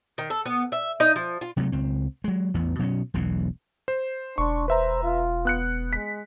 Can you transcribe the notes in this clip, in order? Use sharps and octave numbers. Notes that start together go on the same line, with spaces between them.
D#3
A4
B3
E5
D#4
F3
F4
C3 F#3 G#3 A3
C#2 C4
F#3 G#3
A1 E2 B3
B2 F#3 A#3 C#4
E1 B1 E2 B2
C5
E1 D4 C6 C#6
B4 C5 E5 A#5
F4
B3 F#6 C#7
G#3 B6